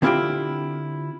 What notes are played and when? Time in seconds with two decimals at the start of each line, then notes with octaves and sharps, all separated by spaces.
0.02 D3 C4 E4 F4 G4 G5